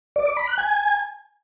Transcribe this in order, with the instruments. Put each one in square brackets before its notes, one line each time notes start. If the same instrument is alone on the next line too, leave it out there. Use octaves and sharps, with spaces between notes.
[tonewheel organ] D5
D6
B5
F#6
G#5